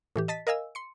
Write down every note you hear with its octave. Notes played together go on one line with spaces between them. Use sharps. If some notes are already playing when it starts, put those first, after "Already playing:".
A2 E3 G4
D#5 A5 A6 B6
A#4 D#5 F5 G#5 E6
C6 C#7